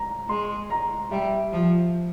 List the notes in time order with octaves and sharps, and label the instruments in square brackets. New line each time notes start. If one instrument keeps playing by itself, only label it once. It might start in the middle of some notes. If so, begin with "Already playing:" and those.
Already playing: [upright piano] A#5
[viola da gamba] G#3 [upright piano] C6
[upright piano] A#5
[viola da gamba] G3 [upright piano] E5
[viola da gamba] F3